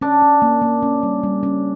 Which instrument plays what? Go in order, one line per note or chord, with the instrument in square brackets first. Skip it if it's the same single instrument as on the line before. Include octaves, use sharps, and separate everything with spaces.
[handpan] C#4 [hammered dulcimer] D4
[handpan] C#4
A#3
A#3
C#4
G3
G3
C#4